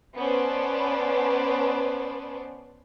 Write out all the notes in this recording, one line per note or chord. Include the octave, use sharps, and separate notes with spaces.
B3 C#4 B4 C5 D5 A5